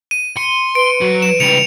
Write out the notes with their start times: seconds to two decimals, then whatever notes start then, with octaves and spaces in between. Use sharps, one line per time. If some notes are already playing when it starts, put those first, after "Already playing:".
0.11 D#7
0.37 C6 C#7
0.75 B4 D7
1.01 F#3 F#4
1.22 E7
1.40 C#2 G3 C#7 F7